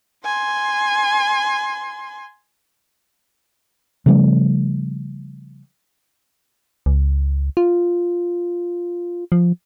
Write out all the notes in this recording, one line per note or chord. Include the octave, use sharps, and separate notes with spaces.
G#5 C6
C#3 F3 G3 A3
C#2
F4
F3